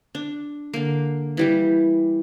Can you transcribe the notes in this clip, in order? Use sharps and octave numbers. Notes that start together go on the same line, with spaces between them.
D4
D3 A#3
E3 G3 G4